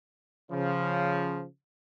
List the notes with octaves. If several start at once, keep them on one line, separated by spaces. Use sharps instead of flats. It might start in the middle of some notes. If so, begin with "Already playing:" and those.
C#3 F3